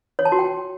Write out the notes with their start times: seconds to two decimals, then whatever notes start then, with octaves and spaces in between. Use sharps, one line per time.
0.19 C#5
0.25 A5
0.32 F#4
0.39 G5